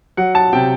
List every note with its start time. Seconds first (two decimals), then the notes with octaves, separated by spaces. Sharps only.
0.17 F#3 F#5
0.35 A5
0.53 C3 G5